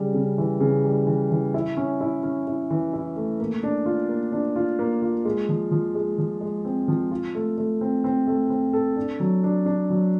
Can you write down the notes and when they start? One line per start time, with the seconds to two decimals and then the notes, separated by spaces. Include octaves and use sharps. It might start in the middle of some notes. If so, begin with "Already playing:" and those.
Already playing: C#3 G3
0.14 C#3
0.38 E3
0.60 C#3
0.85 G3
1.07 E3
1.30 E3
1.54 E4
1.77 C#4
2.01 E4
2.23 C#4
2.47 E4
2.70 E3
2.93 E4
3.16 A3
3.39 A#3
3.63 D4
3.86 F4
4.09 A#3
4.32 D4
4.56 F4
4.79 A#3
5.02 F4
5.25 G#3
5.49 F3
5.71 F3
5.95 G#3
6.18 F3
6.41 G#3
6.65 C4
6.88 F3
7.11 F4
7.35 A3
7.58 A3
7.81 C4
8.04 C4
8.27 A3
8.50 C4
8.73 A4
8.96 D4
9.20 F#3
9.44 D4
9.66 D4
9.90 F#3